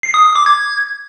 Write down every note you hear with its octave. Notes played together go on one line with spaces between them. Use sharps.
C7
D#6
D#6
D6
G#6